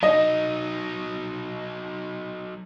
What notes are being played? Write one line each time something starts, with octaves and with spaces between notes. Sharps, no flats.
F#3 D#4 D#5